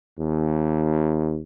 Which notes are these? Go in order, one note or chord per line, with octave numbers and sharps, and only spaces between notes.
D#2